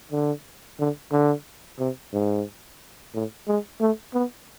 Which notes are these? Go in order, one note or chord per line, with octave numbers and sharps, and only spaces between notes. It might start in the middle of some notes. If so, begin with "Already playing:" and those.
D3
D3
D3
C3
G#2
A2
G#3
A3
B3